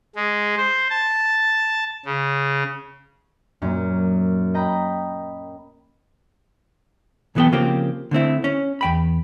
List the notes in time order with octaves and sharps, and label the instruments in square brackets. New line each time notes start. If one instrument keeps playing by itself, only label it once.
[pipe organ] G#3
C5
A5
C#3
[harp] F#2 A#2 C#4
D#5 G5 A#5 B5
[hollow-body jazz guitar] B1 E3 F#3 B3 A4 G5
C#3 F3 A#3 C4 G4
D3 A3 C4 E4
C#4
E2 G5 B5